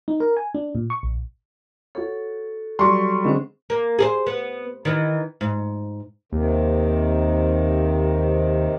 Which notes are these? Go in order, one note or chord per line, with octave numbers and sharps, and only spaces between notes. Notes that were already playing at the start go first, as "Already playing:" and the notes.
D#4
A#4
G#5
D4
A#2
C#6
A#1
F#4 A4 C#5
F#3 G3 C6 C#6
D3 G#3 C4 C#4 C5
A#3
G#4 A#4 C5
B3
D#3 E3
G#2
D#2 C3 D#3